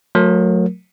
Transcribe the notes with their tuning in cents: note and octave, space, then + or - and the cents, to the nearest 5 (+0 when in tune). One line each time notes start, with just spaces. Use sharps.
F#3 -25 A3 +0 A#4 +5